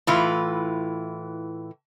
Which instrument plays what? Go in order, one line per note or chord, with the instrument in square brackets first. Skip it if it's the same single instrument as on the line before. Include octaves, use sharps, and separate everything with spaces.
[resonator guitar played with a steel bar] A2 E3 F4